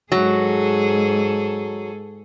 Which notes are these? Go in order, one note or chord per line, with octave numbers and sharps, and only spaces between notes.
G#2 F#3 G#4 A4